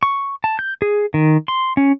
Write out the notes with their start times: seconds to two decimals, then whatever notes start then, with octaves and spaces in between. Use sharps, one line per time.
0.03 C#6
0.44 A5
0.59 G6
0.82 G#4
1.14 D#3
1.48 C6
1.77 C#4